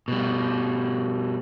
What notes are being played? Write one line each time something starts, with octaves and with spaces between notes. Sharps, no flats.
B2 G3